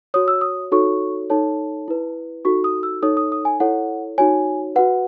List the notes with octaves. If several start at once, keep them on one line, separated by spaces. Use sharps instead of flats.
F#4 C#5 D#6
E6
D#6
D#4 F#4 A4 C#5 C#6
D#4 A4 C#5 A5
E4 B4
D#4 F#4 A4 C#6
D#6
E6
D#4 A4 C#5 D#6
D#6
D#6
G#5
E4 A4 C#5 F#5
D#4 F#4 C#5 G#5
F#4 B4 F#5